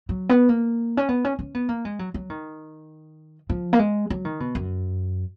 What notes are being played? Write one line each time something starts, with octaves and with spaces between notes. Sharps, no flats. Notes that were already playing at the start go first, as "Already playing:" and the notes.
F#3
B3
A#3
C#4
B3
C#4
C#4
B3
A#3
G#3
F#3
F#3
D#3
F3
A#3
G#3
F#3
D#3
B2
F#2